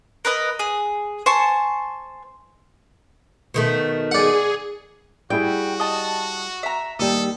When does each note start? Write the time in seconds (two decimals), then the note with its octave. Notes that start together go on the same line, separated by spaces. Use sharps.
0.25 A#4 B4 D#5
0.59 G#4
1.26 C5 G#5 A5 C#6
3.54 B2 D#3 A3
4.11 G#4 D5 F#5
5.30 G3 E4 F#4 G#4 G5
5.80 D#5 A5
6.63 E5 A#5
6.99 D#2 G3 A4 D#6